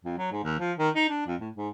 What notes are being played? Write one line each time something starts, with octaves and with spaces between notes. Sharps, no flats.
F2
F#3
G#2
D#2
F3
D#3
D#4
D4
F2
A2
G#2